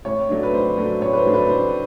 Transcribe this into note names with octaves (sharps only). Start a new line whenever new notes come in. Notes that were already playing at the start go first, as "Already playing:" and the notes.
A2 C#5
F#3 A3 D4
B4
A2 C5
F#3 A3 D4
A2 C#5
B4
C5
F#3 A3 D4
B4
A2 C5